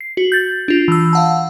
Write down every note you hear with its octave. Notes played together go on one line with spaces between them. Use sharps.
C7
F#4
G6 A6
D4 F4
E3 E6
F5 F#5 A5